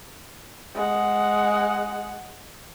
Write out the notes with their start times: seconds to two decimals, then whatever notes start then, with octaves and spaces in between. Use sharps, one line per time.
0.75 G#3 F#5